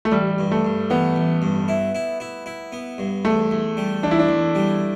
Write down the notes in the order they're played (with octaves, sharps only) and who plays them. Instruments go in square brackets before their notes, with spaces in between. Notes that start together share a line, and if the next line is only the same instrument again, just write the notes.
[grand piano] A3
[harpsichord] A1 [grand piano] G3
[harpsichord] G2
[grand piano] A3
[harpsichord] G2
[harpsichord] E3 [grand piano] B3
[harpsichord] A1
G2
E4
E4
E4
E4
B3
G2
[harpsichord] E2 [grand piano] A3
[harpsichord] E2
G3
[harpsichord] E2 [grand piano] D4
[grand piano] E4
D4
[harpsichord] E2
G3